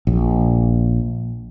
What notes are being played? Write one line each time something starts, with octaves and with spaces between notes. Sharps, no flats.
A#1